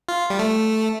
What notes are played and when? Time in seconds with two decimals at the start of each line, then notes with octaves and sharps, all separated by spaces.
0.09 F4
0.30 G3
0.39 A3